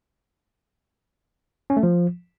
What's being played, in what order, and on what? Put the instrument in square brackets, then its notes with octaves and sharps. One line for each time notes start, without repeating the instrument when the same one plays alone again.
[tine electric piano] C#4
A3
F3